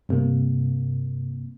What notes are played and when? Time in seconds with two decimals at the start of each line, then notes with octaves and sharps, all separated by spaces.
0.09 G2 C3 A#3